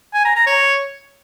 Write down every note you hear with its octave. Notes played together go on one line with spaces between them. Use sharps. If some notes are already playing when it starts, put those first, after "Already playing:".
G#5
A#5
A#5
C#5